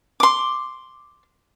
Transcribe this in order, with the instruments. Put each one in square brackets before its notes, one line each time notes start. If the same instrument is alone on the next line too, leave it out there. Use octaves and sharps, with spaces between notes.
[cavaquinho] C6 D6